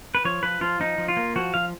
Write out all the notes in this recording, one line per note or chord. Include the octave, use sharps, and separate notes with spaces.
B4
F3 C#5
F3 B4
F3 F4
F3 D#4
F3
F4
A#3
F3 F#4
F3 F5